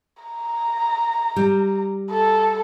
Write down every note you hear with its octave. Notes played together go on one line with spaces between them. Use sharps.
A#5
G3
A4